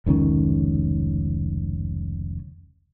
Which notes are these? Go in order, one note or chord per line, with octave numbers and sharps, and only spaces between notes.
F1 C#2 D#3 C#4